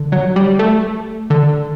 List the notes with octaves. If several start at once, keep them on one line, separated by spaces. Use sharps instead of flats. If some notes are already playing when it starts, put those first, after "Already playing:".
Already playing: D3
F#3
G3
A3
D3